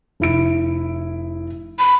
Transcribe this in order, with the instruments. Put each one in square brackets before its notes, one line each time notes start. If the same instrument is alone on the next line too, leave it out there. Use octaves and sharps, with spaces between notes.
[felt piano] F1 E4 D7
[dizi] B5